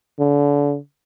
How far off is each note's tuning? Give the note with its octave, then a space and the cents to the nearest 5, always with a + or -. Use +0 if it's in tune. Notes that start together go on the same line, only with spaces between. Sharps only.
D3 -35